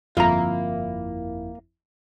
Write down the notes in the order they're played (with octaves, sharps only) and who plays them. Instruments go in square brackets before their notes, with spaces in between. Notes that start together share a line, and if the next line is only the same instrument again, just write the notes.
[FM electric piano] G1 F2 E4 [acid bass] A#3 [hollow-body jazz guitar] F4 A#5